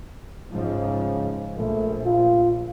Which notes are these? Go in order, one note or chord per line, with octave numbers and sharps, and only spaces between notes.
G#2 C#3 F3
A#1 A3
F4